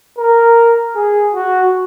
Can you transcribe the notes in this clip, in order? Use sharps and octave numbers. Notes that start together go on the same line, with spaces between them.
A#4
G#4
F#4